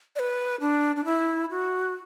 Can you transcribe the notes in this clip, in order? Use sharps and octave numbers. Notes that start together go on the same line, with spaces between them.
D5
B4
D4
D4
E4
F#4